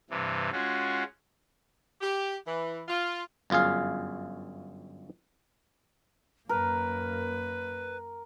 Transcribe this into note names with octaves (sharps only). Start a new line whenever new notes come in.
G2 C3 E3
G#3 C#4 F4 F#4
G4
E3
F4
G1 F#2 F4 G#4 F5
F#2 A#3 A#4 B4